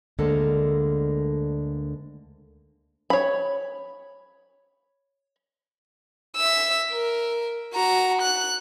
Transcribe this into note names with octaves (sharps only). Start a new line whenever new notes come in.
D2 D3 G#3 A#3 A4 A#4
C#5 B5
E5 E6
A#4
F#4 A#5
F#6